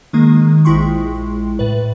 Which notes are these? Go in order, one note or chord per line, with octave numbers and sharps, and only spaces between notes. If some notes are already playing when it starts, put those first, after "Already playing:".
D#3 G#3 A#3
A#1 G#3 E4 G5 C6 C#6
A2 B4